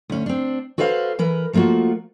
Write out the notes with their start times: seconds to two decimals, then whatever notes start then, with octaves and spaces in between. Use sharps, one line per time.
0.10 D2 C#4
0.26 C4 D4
0.78 F#4 A4 B4 C5 E5 F5
1.19 E3 A#4 B4
1.53 F3 A3 A#3 F4 F#4